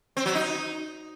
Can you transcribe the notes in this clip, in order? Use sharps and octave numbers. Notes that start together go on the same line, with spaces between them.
C4
F#3
D#4